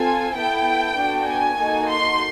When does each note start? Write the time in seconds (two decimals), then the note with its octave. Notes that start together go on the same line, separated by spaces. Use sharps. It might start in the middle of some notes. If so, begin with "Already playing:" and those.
Already playing: C4 F4 A4 G#5
0.35 B3 E4 A4 G5
0.96 B3 D4 F#4 A4
1.26 G#5
1.57 A#3 D#4 F#4 A4
1.88 C6